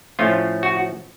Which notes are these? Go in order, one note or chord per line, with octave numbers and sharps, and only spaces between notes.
A2 F3 A3 C#4 F4
F#4